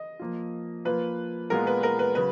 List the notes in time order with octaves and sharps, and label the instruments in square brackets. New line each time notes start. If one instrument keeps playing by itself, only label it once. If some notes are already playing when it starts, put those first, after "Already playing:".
Already playing: [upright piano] D#5
[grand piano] F3 A#3 F4
[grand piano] F3 A#3 F4 [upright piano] B4
[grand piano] A#2 G#3 B3 F4 [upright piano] A#4
[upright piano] B4
A#4
B4
[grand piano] C#3 F#3 [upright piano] B4